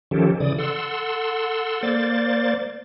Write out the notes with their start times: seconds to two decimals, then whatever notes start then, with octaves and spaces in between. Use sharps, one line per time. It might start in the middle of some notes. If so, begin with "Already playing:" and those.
0.11 D#3 F3 C#4 G4 A4
0.40 C#3 E3 D5 D#6
0.58 A4 F#5 C6 E6
1.83 A#3 C5 D5 A6